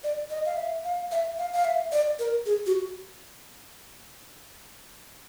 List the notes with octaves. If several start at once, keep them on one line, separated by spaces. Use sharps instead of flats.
D5
D#5
F5
E5
F5
E5
F5
F5
E5
D5
A#4
G#4
F#4